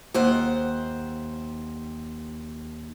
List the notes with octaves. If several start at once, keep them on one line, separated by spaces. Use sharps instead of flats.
D#2 C5 F#5